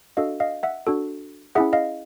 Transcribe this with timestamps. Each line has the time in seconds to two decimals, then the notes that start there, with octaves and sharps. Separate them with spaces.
0.17 D4 F#4 A4 D#5 F5
0.40 D#5 F5
0.63 E5 F#5
0.87 D4 F#4 A4
1.55 C#4 E4 G#4 E5 F#5
1.73 D#5 F5